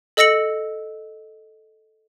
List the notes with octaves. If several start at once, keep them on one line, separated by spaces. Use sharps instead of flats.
A4 D#5 E6 A#6 C#7 F#7